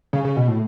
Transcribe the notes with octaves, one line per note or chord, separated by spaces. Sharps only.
C#3
C#3
B2
A2